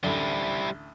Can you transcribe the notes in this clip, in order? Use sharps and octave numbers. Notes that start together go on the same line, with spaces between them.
A1 D2 G3 E4